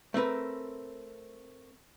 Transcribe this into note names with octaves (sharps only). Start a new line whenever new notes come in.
A3 C4 A#4 B4